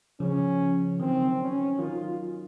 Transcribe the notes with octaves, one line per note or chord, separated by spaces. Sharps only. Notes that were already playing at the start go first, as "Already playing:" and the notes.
C#3 F3 C#4
D#3 F#3 C4
C#4
D#3 F#3 F4